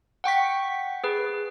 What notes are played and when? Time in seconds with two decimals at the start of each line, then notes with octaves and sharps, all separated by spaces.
0.24 F#5 G5 C#6 B6
1.04 G#4 B4